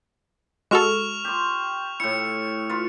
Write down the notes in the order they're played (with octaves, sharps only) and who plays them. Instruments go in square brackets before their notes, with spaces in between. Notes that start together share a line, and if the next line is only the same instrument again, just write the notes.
[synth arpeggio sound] G#3 F#4 A4 [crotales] C#6 F6 F7
[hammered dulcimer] G4 C6
[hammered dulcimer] A2 E4 [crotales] C#7
[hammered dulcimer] F4 B4